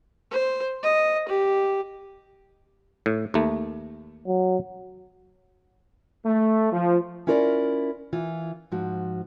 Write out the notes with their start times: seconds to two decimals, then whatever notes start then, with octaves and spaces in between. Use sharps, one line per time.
0.31 C5
0.83 D#5
1.28 G4
3.06 A2
3.34 D#2 A3
4.27 F#3
6.26 A3
6.73 F3
7.27 C#4 E4 F4 A#4 B4 D5
8.13 E3 F4
8.72 G#2 F3 F#4